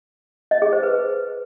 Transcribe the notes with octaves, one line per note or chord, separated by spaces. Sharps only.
D#5
G#4
C5
B4